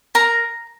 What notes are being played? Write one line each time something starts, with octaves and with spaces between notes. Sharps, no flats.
A#4 A#5